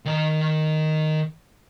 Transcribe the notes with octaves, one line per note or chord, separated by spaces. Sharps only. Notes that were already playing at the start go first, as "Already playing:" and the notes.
D#3 A#5